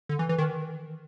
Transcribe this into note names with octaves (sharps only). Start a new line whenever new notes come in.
D3
E3
E3
D#3